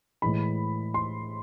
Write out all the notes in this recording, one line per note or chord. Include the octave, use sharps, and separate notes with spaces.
A2 E3 G#3 B5
C6